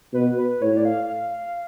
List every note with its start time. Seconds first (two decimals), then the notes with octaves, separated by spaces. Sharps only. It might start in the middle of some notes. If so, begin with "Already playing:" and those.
0.14 B2 B4
0.38 B4
0.61 A2 C#5
0.77 D5
0.85 F5
1.09 F5